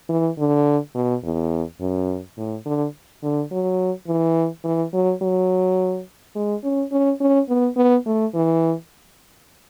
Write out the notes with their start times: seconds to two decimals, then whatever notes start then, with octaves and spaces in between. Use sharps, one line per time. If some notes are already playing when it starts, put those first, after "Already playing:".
0.09 E3
0.38 D3
0.95 B2
1.23 E2
1.80 F#2
2.37 A2
2.65 D3
3.23 D3
3.51 F#3
4.07 E3
4.64 E3
4.93 F#3
5.22 F#3
6.35 G#3
6.64 C#4
6.91 C#4
7.20 C#4
7.49 B3
7.76 B3
8.06 A3
8.34 E3